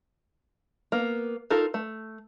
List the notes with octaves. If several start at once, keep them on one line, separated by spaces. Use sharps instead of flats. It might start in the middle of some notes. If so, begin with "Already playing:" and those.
A#3 B3
D#4 F4 A4 A#4
A3